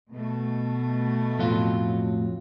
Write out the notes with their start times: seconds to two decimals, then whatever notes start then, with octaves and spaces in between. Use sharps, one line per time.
0.11 B2 A3
1.39 F2 A2 F#3 F4